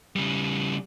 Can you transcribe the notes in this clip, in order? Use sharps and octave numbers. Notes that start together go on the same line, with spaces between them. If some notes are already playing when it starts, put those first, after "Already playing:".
C#3 G3